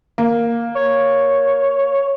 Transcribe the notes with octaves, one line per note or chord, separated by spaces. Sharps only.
A#3
C#5